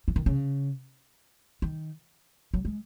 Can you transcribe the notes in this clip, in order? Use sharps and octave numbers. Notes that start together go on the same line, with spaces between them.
E3
D#3
C#3
D#3
F#3
G#3